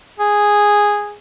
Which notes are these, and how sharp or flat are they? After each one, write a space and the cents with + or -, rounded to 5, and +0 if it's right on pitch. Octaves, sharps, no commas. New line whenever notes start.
G#4 -5